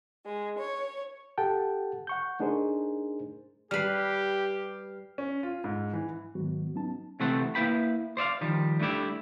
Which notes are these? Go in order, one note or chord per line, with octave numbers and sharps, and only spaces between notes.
G#3
C#5
G4 A4 F#5 G5 A5
F#5 C#6 G6
A3 D4 D#4 G#4 A#4 C5
G3 G4 B4 F6 C7
C#4
F4
G#2
E3
G#2 D#3 F#3 B3 F#4
C2 F#3 B3 C#4 D#4 A5
C3 E3 A3 C4 A4 F#5
A#3 E4 B4 G5 B5
C5 D5 E5 F5
D#3 F3 G3
G3 A3 D4 E4 G4